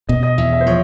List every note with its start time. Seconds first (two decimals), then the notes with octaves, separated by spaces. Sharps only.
0.09 B2 D#5
0.23 D#5
0.38 E2 E5
0.53 E5
0.61 C5
0.66 F3 C#5